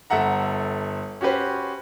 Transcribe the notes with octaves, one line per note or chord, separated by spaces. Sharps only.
G1 A4 E5 F#5 A#5
C#4 F#4 G4 B4 C5